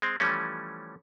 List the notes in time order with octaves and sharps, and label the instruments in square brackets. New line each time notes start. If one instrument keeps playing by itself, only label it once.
[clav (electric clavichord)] G#3 C4
E3 F3 G3 A3 C#4